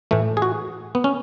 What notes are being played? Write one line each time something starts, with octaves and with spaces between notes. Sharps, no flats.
A2 E3 A3
G#4
F#4
B3
C#4